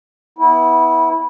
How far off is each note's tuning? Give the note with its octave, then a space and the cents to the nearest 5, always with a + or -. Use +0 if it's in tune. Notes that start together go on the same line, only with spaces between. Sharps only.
B3 +0 E4 -20